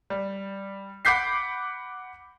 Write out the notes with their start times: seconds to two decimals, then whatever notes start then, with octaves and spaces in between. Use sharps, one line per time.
0.10 G3
1.05 F#5 B5 D6 G6 B6 C7